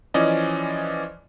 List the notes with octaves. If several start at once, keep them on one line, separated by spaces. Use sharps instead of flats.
E3 F3 C#4 D5 D#5